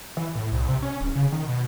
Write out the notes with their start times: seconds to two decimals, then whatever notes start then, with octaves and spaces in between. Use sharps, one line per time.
0.17 E3
0.35 A2
0.52 C2
0.68 C3
0.82 C#4
1.01 D1
1.15 C#3
1.32 D#3
1.47 B2